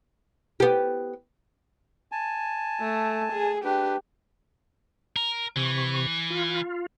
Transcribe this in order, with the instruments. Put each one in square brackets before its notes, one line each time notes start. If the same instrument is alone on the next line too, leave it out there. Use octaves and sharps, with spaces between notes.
[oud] B3 G4
[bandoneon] G#5 A5
[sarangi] A3
G#4
[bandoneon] D4 B4 [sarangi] G4
[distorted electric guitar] A#4
[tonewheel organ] C3 C#6 [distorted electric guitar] E3
[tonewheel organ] F4